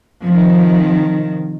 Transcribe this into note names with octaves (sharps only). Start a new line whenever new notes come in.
C3 D#3 F3